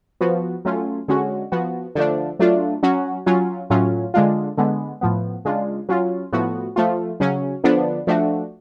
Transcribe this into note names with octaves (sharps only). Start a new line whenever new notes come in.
F3 B3 F#4
F#3 A3 C#4 F4
D3 G#3 C#4 F#4
F3 B3 F#4
D3 F3 A3 D4
F#3 A3 D4 F4
F#3 C#4 F#4
F#3 C#4 F4
A2 F#3 C#4 F4
D3 G#3 D4 F4
D3 G#3 B3
A2 F3 B3
C#3 G#3 D4 F4
F#3 C#4 F4
A2 F3 B3 F#4
F3 A3 F4
C#3 F#3 C#4
D3 F3 B3 D4
F3 A3 D4 F#4